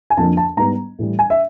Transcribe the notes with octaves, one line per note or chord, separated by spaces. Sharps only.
G#5
F2 D3 F3 A#3 A5
A5
G#2 D#3 G3 B3 A#5
A2 E3 G3
G#5
E5